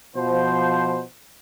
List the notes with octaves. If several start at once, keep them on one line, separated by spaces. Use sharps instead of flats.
B2 F3 C5